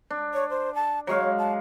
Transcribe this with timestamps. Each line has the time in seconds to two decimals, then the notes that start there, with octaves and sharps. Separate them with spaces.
0.10 D4
0.34 C#5
0.50 C5
0.75 A5
1.07 F#3 G#3 C#5 F5
1.38 A5